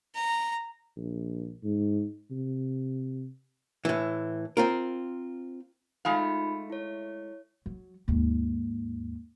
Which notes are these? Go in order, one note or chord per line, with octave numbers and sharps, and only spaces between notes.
A#5
A#1
G#2
C3
A2 E3
C4 F4 A#4
G#3 A3 D#4 F4 F5 B5
E4 C#5
F#3
D#2 G#2